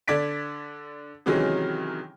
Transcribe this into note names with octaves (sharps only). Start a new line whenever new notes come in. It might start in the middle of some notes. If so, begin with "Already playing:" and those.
D3 D5 G#6 B6 D7
C3 D#3 E3 F#3 G#3 C#4